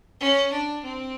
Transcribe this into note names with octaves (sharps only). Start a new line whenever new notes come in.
C#4
D4
C4